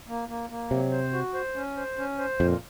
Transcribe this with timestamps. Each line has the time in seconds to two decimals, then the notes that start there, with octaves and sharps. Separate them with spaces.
0.08 A#3
0.29 A#3
0.50 A#3
0.71 C3 F#3
0.92 C5
1.13 F#4
1.34 C5
1.55 C#4
1.77 C5
1.98 C#4
2.18 C5
2.39 F2 A#2